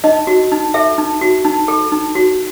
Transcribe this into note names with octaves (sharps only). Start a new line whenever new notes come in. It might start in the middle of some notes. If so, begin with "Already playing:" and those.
D#4 D#5
F#4
D#4
A4 E5
D#4
F#4
D#4
A4
D#4
F#4